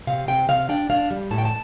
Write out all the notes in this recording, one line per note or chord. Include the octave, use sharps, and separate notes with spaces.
C3 F5
C3 G5
C3 F5
D4 G5
D4 F5
G3
A2 A5
G5
A5